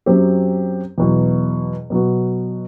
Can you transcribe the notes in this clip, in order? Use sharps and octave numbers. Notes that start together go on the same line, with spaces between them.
F#2 F#3 C4 G4
E2 B2 F#3
B2 F#3 B3 F#4